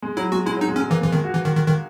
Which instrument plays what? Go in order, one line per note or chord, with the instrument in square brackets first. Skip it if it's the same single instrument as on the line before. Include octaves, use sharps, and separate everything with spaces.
[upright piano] G#3
[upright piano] F#3 [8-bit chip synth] E4
[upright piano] G#3 [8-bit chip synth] F#4
[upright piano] G#3 [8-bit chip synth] E4
[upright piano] F#3 [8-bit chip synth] D#4
[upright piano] G#3
[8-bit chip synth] C#4
[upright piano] G#3
[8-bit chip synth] E3 [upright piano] A#3
[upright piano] G#3
[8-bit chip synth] E3
[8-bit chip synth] D#3 [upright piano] G#3
[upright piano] F#4
[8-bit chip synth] E3
D#3
D#3
D#3